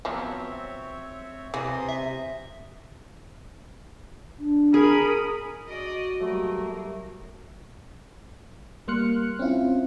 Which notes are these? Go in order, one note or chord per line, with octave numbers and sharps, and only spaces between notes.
F3 F#3 B3 C4 C#5 E5
C3 E3 C6 D#6
E5
D4
G#4 A#4 B5 D#6
F#4 D5 D#5
F#3 G3 A3 A#3
G3 A#3 C6 F6 F#6 C#7
C4 C#4 E4 F4